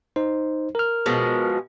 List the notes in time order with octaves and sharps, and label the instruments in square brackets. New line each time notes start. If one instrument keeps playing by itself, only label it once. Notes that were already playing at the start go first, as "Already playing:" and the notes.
[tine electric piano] D#4 C5
A#4 F6
[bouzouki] B2 F3 G#3